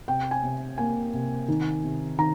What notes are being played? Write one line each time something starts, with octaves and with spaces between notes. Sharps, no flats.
C3 G5
G#5
C3
A#3 G#5
C3
D#3
C3
D#3 A#5